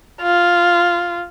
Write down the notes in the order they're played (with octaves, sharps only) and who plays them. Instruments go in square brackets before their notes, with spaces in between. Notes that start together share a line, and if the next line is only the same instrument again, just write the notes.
[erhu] F4